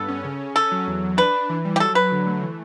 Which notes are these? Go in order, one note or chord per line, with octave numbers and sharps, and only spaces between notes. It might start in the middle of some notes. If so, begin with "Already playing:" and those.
Already playing: G2 B3 A4
C#4
C#3
C#3
C#4 A4
F#3
E2
E2
D4 B4
D4
E3
G3
G4
F#3 A4
F#3 B4
D3
A3
E3